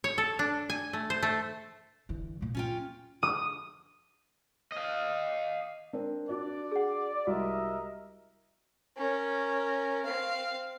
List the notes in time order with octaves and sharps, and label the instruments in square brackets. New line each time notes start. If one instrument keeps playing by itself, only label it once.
[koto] C#5
A4
D4
G#5
A3
C5
A3
[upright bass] D3 E3
A#2 A#3
[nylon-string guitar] C#4 F4 G5
[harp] D#6
[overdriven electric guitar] D#5 F5
[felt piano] C4 D4 A#4
[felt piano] D4 F#4 [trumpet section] D5
[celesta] G#4 F#5
[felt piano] C2 [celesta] F#4 [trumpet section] A#4 D#5 E5
[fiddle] C#4 A#4
C4 F5